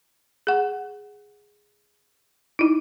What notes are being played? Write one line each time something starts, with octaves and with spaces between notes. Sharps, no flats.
G#4 F#5
D#4 E4